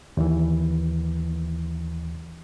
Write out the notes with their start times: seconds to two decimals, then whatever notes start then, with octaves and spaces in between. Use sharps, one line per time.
0.17 D#2 E3